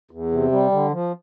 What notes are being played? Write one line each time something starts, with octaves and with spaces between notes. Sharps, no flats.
E2
C3
G3
D3
F3